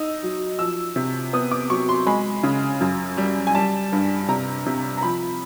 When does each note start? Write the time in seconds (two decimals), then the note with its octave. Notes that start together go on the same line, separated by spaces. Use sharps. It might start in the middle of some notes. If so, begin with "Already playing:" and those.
Already playing: D#4 E6
0.23 F#3
0.59 F3 E6
0.96 C3
1.33 B3 D#6
1.51 D6
1.70 F#3 C#6
1.89 C6
2.06 G#3 B5
2.43 C#3
2.81 F#2
3.17 G3
3.47 G#5
3.55 G3 A5
3.93 G2
4.28 C3 A#5
4.66 C3
4.97 A#5
5.02 F3 B5